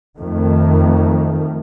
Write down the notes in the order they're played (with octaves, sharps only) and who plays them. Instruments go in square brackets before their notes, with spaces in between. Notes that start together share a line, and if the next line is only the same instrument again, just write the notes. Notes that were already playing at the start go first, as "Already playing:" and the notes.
[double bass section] F2 D#3 A3